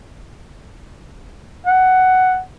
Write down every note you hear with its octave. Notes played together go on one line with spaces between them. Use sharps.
F#5